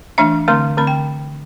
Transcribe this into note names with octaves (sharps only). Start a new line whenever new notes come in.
E3 A3 D4 E5
D3 A3 C4 C6
D3 A3 C4 B5
G5